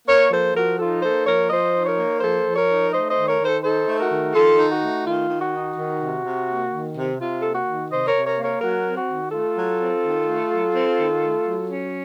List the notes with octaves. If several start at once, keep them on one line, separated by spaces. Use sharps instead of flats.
A#3 A#4 C#5
F3 A4 C5
F3 F#4 A#4
D#4 F4 A4
A#3 A4 C5
F3 A#4 C#5
F3 C5 D#5
D#4
A#4 C#5
A#3
F3 A4 C5
F3
A#4 C#5
D#4
A3 C5 D#5
C5 D#5
D#3
A#4 C#5
D#3
A4 C5
D#4 A4 C5
A3
F#4 A#4
D#3
D#3 F4 A4
D#4
F#4
A3
D#3 F4
D#3
F#4
D#4
D#3
C3
C3
A#3
D#3
C3
C3 F4
A#3 A4
F#4
D#3
C3 C5 D#5
A#4 C#5
C3
A#4 C#5
A#3
A#4 C#5
F#3 F#4 A#4
C4
F#4
D#3
A3 F4 A4
F#3
C4
D#3
A3
F#3
C4
D#3
A3
F#3
C#4